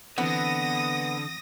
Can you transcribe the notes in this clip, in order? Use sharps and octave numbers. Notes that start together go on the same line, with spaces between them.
D3 E3 B3 C4 F#5 D#6 A#6